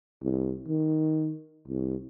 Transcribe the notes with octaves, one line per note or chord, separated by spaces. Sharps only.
C2
D#3
C2